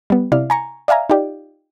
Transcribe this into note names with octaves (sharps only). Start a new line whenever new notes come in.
G3 B3
C3 E4 D5 F5
G#5 A#5 C#6
D5 E5 F5 G#5 A#5
D#4 F4 G4 D5